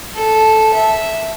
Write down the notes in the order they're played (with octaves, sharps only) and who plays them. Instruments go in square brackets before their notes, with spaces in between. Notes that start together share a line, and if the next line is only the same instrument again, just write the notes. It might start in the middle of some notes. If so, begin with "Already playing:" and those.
[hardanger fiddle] A4
E5